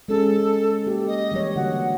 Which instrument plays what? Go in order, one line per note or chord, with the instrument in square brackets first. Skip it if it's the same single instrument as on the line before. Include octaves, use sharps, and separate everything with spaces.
[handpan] G#3 C#4 G#4 [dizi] A4
[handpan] A#3 G4
[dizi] D#5
[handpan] E3 G3 C#5
[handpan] D3 A#3 F#4 [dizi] F#5